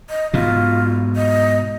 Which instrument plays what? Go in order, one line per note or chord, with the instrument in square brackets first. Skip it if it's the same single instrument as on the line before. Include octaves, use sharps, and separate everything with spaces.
[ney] D#5
[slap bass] G#2 B2 [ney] F4
[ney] D#5